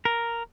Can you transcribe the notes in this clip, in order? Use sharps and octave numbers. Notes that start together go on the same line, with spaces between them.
A#4